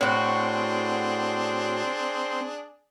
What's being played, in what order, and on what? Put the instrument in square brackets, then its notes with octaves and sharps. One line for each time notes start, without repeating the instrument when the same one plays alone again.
[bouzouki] A2 F#4 [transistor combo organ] C4 [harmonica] D4 G#4